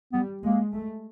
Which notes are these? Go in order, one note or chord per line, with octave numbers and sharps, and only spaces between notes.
G3 B3
G#3 A#3
A3